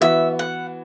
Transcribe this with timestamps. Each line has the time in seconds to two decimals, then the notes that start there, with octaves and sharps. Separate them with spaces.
0.01 E3 B3 F#4 E5
0.39 F#5